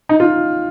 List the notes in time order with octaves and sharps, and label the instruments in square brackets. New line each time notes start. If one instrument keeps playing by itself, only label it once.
[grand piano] D#4
F4